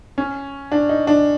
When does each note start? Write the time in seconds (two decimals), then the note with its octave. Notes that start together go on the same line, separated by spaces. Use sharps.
0.18 C#4
0.72 D4
0.89 D#4
1.07 D4